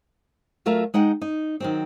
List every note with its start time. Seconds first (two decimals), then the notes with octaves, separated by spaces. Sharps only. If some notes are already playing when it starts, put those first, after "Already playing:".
0.66 F#3 A3 F4 A#4 E5
0.94 G#3 D#4 F#5 G5
1.22 D#4
1.60 D#3 F#3 C4